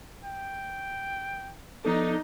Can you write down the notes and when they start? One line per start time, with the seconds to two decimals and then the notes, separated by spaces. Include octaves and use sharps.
0.24 G5
1.85 F3 B3 D4 D#4 A4